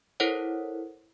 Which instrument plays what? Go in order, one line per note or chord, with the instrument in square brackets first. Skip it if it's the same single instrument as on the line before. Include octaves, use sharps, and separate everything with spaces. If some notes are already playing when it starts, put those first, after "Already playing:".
[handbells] E4 A4 A#4 C5 C#5 F#5